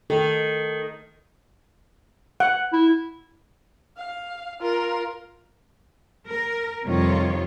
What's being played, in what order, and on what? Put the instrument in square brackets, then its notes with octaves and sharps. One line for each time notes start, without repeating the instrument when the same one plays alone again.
[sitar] D#3 [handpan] A4
[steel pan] F#5
[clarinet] E4
[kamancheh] F5
F4 A#4
[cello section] A#4
F2 C3 D#3 G3 F4 C#5